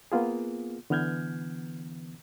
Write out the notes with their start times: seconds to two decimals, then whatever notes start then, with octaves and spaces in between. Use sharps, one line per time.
0.12 A#3 B3 F4 G#4
0.90 D3 E3 B3 F6 G6 G#6